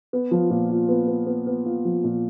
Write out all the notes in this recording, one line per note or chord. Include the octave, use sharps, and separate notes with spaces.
B3
F3
A#2
F4
B3
B3
B3
B3
F4
F3
A#2